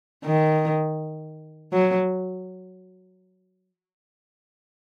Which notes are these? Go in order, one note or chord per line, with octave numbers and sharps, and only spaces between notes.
D#3
F#3